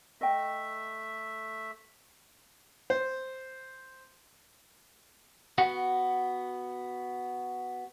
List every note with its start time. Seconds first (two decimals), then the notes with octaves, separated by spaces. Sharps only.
0.21 A3 D#5 E5 G5
2.90 C5
5.58 B3 F#4 F#5